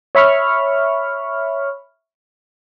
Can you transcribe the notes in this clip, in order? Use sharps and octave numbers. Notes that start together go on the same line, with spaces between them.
C#5 E5 B5 C#6 F6